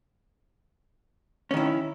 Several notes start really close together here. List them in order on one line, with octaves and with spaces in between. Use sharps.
C#4 D#3 E4